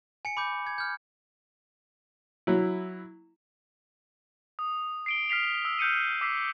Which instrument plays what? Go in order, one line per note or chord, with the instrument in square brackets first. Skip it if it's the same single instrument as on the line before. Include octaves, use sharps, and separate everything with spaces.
[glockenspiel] G#5 C#7
B5 D6 G6
G#6
F6 G6
[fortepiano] F#3 E4
[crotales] D#6
C7 D7 G7
F6 B6 C7 F7
E6
F6 G6 C#7 D#7
D6 E6 B6 C7